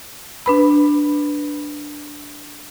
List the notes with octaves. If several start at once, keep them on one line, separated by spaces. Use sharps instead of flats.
D4 B4 B5